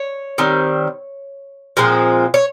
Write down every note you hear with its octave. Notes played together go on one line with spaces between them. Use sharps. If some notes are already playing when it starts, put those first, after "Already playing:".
Already playing: C#5
D#3 G3 C4
A#2 F3 G#3 C4
C#5